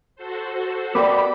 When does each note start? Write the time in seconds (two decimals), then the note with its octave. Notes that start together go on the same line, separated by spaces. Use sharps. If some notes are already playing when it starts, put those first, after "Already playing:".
0.16 F#4 A4 C5
0.95 B3 G4 A#4 D5 B5 D6